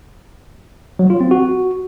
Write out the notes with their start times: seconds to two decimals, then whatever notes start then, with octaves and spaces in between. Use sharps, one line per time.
0.99 F#3
1.10 F4
1.21 C4
1.31 F#4